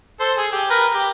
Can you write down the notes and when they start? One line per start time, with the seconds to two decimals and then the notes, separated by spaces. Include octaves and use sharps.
0.20 A4 C5
0.37 G#4
0.52 G4
0.70 A#4 B4
0.93 G4